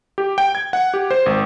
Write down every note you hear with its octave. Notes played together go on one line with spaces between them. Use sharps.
G4
G5
G#6
F#5
G4
C5
G#1